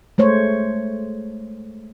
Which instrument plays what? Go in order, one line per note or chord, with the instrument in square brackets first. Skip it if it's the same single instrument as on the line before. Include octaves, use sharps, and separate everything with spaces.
[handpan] G#3 A3 C5 C#5